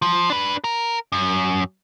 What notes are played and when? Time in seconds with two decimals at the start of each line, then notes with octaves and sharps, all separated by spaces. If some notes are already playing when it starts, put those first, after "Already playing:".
0.02 F3
0.30 D4 B4
0.64 A#4
1.12 F#2